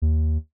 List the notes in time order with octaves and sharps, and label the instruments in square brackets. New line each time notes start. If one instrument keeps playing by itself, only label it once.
[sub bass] D#2